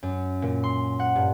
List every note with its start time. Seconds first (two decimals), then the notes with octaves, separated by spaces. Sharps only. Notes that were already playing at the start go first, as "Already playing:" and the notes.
0.03 F#2
0.42 A#2
0.64 C6
1.00 F#5
1.15 G2